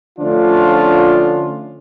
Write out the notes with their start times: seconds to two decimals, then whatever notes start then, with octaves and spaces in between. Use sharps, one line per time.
0.18 D3 F3 A3 C#4 D4 F4